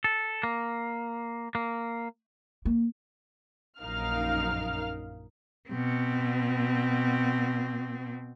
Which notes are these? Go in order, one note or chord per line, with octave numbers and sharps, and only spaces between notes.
A4
A#3
A#3
A#3
A#1 F#2 D#4 A#4 F5 F6
B2 C4